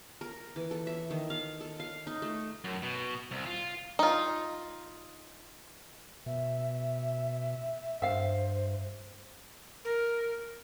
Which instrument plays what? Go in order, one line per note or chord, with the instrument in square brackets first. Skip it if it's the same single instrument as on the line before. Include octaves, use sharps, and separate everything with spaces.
[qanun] A#4
E3
A4
E5
D#3
F5
A4
F5
D#4
A3
[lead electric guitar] F#2
B2
C2
F4
[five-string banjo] D#4 F4
[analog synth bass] B2 [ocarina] E5
[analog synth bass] G2 [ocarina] C5 [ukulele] E5 F5
[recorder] A#4